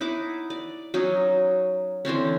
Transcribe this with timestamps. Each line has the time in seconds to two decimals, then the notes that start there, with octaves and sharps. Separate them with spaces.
0.01 D#4 E4 F#5 D6
0.50 D5
0.94 F#3 C#4 D#4
2.05 D3 E3 C4 C#4